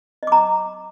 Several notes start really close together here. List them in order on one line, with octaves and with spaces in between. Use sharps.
D#5 D6 A#5